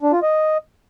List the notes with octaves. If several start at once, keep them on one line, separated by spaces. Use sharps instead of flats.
D4
F4
D#5